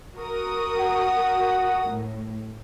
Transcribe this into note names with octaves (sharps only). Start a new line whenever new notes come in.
F#4 A#4 D#6
F#5
A2